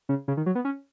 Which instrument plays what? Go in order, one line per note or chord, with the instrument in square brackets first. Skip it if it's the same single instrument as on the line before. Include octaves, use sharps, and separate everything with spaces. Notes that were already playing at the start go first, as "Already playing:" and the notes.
[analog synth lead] C#3
C#3
D#3
F#3
B3
C#4